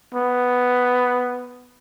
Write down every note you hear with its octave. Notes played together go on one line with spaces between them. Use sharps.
B3